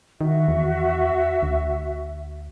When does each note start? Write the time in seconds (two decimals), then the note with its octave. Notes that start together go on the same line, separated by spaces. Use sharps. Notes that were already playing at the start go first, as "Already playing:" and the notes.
0.21 D#3 F#4 E5
0.48 E2
1.42 D2